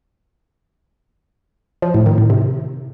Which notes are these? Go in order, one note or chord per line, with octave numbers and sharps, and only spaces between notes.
F3
A2
D#3
A2
C3